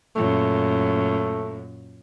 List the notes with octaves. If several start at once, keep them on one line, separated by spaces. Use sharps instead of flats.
F#2 A#2 A3